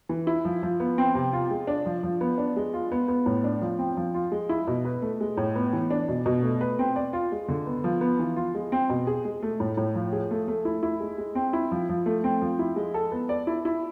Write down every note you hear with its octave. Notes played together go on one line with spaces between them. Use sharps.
E3
E4
F3
F3
B3
C4
C3
F4
G#3
D4
F3
F3
B3
D4
G#3
F4
B3
B3
A2
D4
F3
C4
F3
F4
G#3
E4
B2
B4
A3
G#3
A2
B3
E3
D4
B2
B2
A3
B4
C4
D5
F4
G#3
D3
B3
F3
B3
E3
F4
G#3
C4
B2
G#4
G#3
A3
A2
A2
F3
G#4
A3
A3
E4
E4
G#3
G#3
C4
E4
F3
F3
A3
C4
F3
E4
G#3
A4
B3
D5
E4
E4